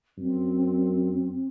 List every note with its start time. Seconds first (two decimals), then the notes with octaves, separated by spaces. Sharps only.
0.18 F#2 C4